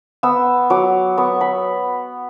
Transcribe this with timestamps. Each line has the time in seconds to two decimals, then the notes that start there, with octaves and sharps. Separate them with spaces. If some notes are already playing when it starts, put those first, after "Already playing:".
0.23 B3 E6
0.70 F#3 D6
1.18 B3 C#6
1.41 B5